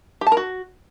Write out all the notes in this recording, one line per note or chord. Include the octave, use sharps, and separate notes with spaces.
G4
A5
A#4
F#4